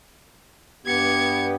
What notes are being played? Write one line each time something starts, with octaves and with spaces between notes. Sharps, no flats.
G2 B3 G4 G#6 C#7